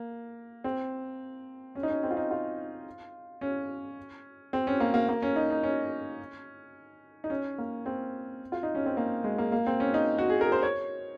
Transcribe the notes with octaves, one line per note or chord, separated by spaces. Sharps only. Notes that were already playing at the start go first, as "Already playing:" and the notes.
Already playing: A#3
C4
C#4
D#4
C#4
C4
F4
D#4
F4
C#4
C4
C#4
A#3
A#3
A#3
C#4
D#4
D#4
C#4
D#4
C#4
A#3
C4
F4
D#4
C#4
C4
A#3
G#3
A#3
A#3
C4
C#4
D#4
F#4
G#4
A#4
C5
C#5